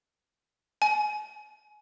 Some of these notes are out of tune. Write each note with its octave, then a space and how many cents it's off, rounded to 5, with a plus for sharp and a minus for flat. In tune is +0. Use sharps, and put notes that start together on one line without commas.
G#5 +25